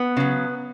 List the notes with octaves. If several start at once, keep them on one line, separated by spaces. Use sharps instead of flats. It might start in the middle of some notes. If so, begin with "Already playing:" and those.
Already playing: B3
C#3 F#3